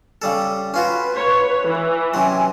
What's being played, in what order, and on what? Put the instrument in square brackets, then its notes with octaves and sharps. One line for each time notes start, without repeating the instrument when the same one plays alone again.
[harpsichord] C#3 G3 A4
[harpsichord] C#4 F4 F#4 [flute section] B4
[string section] C#5
E3
[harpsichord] C3 F#3 [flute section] C#4 G#5